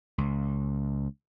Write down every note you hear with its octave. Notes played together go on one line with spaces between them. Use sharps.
C#2